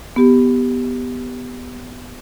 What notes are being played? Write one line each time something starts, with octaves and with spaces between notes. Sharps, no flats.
B3 G4